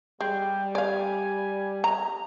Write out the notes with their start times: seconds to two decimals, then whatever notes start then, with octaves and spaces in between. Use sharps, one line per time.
0.21 G3 G#3 G5
0.75 D5 F5 G#5
1.84 A#5